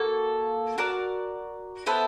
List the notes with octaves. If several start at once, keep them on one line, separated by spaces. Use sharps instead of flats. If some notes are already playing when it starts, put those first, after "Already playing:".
Already playing: A#3 F#4 A4
F#4 A#4 D5
B3 E4 A4 C5